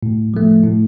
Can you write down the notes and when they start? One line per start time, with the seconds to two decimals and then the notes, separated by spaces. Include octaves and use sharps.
0.03 A2
0.34 F3 A3
0.64 A2